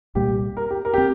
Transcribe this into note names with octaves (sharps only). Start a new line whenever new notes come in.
C2 A#2 G3 A#3 G4
A#4
G4
A#4
C4 G4